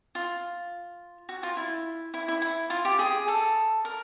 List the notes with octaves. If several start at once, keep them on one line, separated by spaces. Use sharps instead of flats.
F4
F#4
F4
E4
E4
E4
E4
F4
G4
G#4
A4
A#4